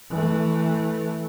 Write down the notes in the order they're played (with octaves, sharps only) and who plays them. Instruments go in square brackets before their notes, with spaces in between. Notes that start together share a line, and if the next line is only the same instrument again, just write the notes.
[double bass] E3 A3